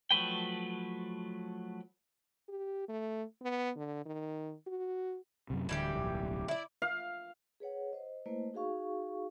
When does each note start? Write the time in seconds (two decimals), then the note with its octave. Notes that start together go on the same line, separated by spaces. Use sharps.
0.11 F3 F#3 A3 B4 G5
2.49 G4
2.89 A3
3.42 B3
3.76 D3
4.06 D#3
4.67 F#4
5.50 F#2 A2 C3
5.69 D1 D3 E3 G3 G4
5.96 D1 B1
6.48 E4 D5
6.82 F5
7.60 G#4 B4 C#5 F#5
7.93 C5 D#5
8.26 A3 A#3 E4 B4 C5 D#5
8.54 D#4 F#4 G#4 F5 C#6